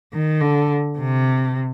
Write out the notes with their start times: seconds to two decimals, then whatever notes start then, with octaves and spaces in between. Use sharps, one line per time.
0.13 D#3
0.41 D3
0.98 C3